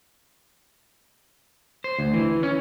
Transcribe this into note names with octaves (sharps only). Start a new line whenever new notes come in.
C5
D2
E3
C#4